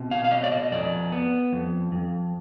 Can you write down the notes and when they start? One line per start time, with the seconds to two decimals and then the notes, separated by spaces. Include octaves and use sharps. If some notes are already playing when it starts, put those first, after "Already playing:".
Already playing: B2 C4
0.11 F5
0.24 F5
0.31 B2 D#5
0.44 D5
0.52 D#5
0.72 F2 D5
1.12 B3
1.52 F2
1.92 F2